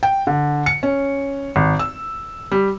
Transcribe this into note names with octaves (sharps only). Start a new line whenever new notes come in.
G5
D3
C#7
C#4
G#1
E6
G3